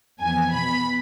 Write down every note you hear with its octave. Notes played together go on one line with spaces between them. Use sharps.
F2 E3 B3 G#5
B2 B3 B5